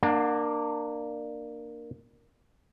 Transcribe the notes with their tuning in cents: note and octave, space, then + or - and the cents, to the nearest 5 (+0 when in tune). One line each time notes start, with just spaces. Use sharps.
A#3 +0 D4 +25 F#5 -35